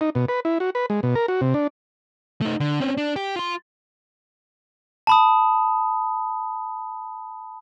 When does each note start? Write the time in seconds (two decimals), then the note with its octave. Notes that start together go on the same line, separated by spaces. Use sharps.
0.01 D#4
0.15 B2
0.29 B4
0.45 E4
0.60 F#4
0.75 B4
0.90 G#3
1.03 B2
1.15 A#4
1.28 F#4
1.41 C3
1.54 D4
2.41 A3 D#4
2.60 D3
2.80 C4 C#4
2.97 D4
3.16 G4
3.36 F4 C6
5.07 A5 B5 D#6